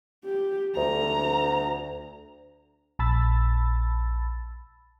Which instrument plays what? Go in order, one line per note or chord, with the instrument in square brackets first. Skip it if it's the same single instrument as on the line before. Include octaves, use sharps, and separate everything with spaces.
[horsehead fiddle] G4
[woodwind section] D2 [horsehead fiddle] A#5
[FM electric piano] A#1 A5 B5 E6 A6